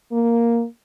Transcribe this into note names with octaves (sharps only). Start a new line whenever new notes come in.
A#3